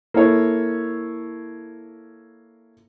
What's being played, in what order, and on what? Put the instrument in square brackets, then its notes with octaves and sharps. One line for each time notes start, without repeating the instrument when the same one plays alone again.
[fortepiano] A#3 E4 A4 C#5